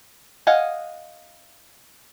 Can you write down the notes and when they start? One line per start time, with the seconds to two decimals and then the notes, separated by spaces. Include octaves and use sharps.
0.47 D#5 F5 F#5 G#5